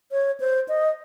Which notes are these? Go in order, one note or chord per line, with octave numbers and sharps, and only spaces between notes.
C#5
C5
D#5